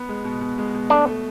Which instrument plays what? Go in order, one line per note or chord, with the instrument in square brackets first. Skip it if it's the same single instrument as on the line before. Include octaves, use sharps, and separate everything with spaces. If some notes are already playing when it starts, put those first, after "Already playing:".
Already playing: [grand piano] B3
G#3
B2
B2
G#3
B2
[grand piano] A3 [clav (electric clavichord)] D4
[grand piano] A3